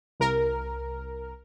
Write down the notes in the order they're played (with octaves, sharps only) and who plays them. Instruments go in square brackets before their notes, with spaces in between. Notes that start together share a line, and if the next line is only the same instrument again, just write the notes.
[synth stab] C2 A#4